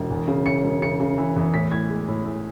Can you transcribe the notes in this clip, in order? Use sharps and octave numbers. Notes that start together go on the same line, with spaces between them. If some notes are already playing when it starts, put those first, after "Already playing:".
Already playing: E1
E2
C#3
C#3 C#7
E1
C#3 C#7
C#3
E3
E2
A2 B6
A2 G#6
G#3
A2
A2